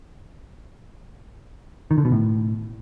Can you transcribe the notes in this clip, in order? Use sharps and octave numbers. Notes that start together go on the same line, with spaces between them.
D#3
D3
B2
A2